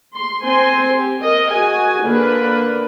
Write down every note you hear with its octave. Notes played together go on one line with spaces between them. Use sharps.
C6
C4 C5 G#5 C6
G4
A#4 D#5
F#4 G#4 G#5
D3 A#3 D4 B4